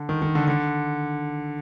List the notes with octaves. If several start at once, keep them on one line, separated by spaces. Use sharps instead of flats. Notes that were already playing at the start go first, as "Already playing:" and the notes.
Already playing: D3
D#3
D#3
D3
D3